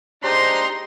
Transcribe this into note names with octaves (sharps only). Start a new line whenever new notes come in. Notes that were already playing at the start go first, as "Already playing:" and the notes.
G#3 D4 D#4 G4 C5 A#5 C6